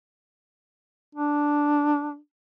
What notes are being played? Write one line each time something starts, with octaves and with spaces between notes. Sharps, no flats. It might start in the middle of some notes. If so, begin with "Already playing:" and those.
D4